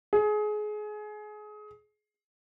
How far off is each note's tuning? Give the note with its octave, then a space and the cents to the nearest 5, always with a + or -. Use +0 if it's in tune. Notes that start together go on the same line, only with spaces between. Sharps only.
G#4 +25